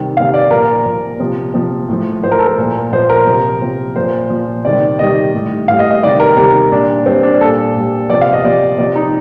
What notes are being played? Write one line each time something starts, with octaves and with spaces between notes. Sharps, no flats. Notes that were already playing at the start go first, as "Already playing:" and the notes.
Already playing: C3 D#3 G3
C3 D#3 G3 F5
D5
A#2 F3 A#4
A#2 F3
C3 F3
C3 F3
A2 F3
A2 F3 C5
A#4
A4
A#4
A#2 F3
A#2 F3 C5
A#4
C3 F3
C3 F3
A#2 F3 C5
A#2 F3
C3 D#3 G3 D5
C3 D#3 G3 D#5
A2 G3
A2 G3 F5
D#5
D#5
C3 D#3 G3 D5
A#4
C3 D#3 G3 A#4
A#2 G3 D4
A#2 G3 C4
D4
A#2 G3 A4
A#2 G3
C3 F3 D5
F5
D#5
C3 F3 D5
C3 F3 D5
D#4